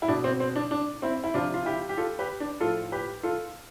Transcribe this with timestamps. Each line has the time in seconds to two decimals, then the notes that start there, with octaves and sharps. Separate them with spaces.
0.02 E4
0.08 B2 D4
0.24 C4
0.40 C4
0.56 D4
0.71 D4
1.02 C4 E4
1.24 E4
1.34 C3 F3 D4 F4
1.54 F4
1.65 E4 G4
1.89 G4
1.97 F4 A4
2.19 G4 B4
2.40 D4
2.60 A2 F3 F4 A4
2.92 G4 B4
3.23 F4 A4